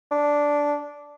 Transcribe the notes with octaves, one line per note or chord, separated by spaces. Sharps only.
D4